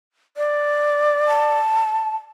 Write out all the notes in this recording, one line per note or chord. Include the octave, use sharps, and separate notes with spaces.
D5
A5